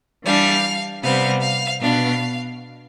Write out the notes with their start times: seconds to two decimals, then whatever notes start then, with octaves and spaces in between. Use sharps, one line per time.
0.25 E3 G3 D4 F5
1.03 C3 G3 B3 F5
1.42 F5
1.82 B2 B3 D4 F5